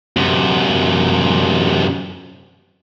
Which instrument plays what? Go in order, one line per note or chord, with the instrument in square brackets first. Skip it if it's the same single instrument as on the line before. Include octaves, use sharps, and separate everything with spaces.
[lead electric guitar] F#2 C3